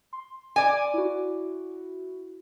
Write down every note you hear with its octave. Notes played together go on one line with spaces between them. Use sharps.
C6
D5 G#5
E4 F#4